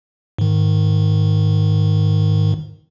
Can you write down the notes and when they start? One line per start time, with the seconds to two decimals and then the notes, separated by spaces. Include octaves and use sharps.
0.39 G#2 D#3